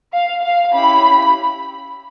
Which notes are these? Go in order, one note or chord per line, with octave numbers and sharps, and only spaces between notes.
F5
F5
C#4 E4 G4 B5